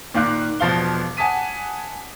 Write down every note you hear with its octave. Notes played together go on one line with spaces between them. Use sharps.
A#2 D#3 F5 D6 F#6
E1 B2 F3 C5 F5 G7
F#5 G#5 A5 D#6 B6 D#7